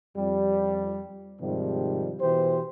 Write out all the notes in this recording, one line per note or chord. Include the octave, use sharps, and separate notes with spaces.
F2 G3
G#2 C3 D#3 F3 G3
B2 E3 G4 C5